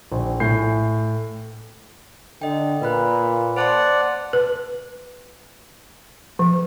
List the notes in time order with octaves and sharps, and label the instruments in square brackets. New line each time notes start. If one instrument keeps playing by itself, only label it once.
[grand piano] A#1
A2 G#5 G6 C7
[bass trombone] D3 [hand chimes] D#5 G5
[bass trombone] A#2 [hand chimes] B4 B5 F#6
[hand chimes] C5 A5 C6 [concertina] D5 F#5
[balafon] B4
F3